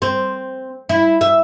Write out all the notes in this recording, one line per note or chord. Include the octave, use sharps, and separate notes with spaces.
C4
E4
E5